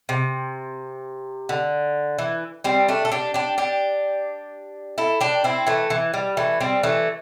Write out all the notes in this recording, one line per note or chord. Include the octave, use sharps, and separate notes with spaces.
C3
D3
E3
G3 C4
A3 D4
A4
D4 G4
D4 G4
D4 G4
E4 A4
D4 G4
C4 E4
E3 A3
E3
G3
E3 A3
G3 C4
E3 A3